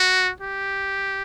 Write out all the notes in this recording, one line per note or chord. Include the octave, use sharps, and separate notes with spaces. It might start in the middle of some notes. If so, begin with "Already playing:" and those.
Already playing: F#4
G4